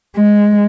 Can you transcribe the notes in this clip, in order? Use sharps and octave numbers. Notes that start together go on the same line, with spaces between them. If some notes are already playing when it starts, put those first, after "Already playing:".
G#3